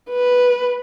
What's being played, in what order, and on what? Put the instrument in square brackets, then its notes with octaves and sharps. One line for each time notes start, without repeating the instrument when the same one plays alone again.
[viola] B4